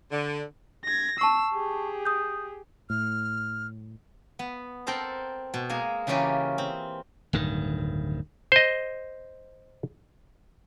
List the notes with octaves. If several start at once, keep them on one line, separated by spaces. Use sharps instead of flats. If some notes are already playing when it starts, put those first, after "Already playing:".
D3
G#6 A#6
A5 C#6 E6 C7
G4 G#4
D#6 G6
A2 F6
B3
C4 A4 A#4 C5 A#5
B2
G#3 A#3 A#4 G#5
C#3 E3 A#3 C#4 F4 G4
C4
D1 G2 D#3
C5 D#5